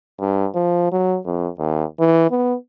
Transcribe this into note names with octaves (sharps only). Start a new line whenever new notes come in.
G2
F3
F#3
F2
D#2
E3
B3